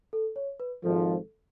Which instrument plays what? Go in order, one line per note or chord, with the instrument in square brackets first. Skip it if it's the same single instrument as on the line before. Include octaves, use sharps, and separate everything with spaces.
[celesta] A4
C#5
B4
[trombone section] G#1 G#2 F3 [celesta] A4